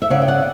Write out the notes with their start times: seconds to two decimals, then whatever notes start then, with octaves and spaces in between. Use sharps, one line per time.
0.02 E5
0.10 C#3 D5 F#5
0.22 G5
0.28 D5 F#5